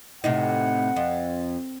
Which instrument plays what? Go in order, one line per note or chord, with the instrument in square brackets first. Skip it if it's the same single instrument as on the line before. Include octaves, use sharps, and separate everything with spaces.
[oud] A2 C3 D#4 [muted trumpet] F#5
[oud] F2